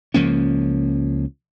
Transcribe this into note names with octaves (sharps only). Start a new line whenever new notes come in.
C#2 F3 A#3 C#4